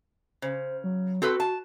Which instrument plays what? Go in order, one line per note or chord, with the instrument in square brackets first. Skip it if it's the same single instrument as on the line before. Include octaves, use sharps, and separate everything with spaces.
[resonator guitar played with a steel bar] C#3 [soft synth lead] C5
[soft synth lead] F#3
[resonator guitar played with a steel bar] C4 A4 B4 [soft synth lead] F#4
[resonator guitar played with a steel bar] A5